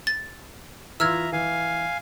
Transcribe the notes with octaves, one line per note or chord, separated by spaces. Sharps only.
A6
E3 F4 E5 A#5 E6 F6 G#6
E3 F5 G#5